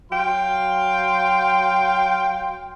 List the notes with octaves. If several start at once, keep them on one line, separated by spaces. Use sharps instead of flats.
F#3 F5 G5 C6